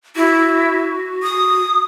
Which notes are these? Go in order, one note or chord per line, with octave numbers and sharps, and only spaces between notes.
E4 F#4
D#6